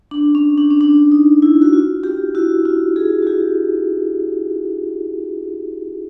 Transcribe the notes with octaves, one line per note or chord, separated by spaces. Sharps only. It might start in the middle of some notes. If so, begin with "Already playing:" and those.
D4
C#4
D4
C#4
D4
D#4
E4
F#4
F4
F4 G4
E4 F#4
F4 G4
F#4 G#4
F#4
F4 G4